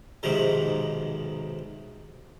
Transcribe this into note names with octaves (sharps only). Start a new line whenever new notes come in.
B1 G#2 C3 D#3 F3